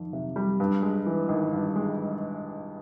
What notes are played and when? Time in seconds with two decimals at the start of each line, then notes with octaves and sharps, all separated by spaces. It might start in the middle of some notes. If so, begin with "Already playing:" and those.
Already playing: F2 D#3
0.13 C3
0.36 G3
0.60 G2
0.83 G#3
1.06 E3
1.29 G#1
1.53 G2
1.76 G#3